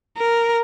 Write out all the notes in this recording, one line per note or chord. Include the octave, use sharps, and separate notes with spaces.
A#4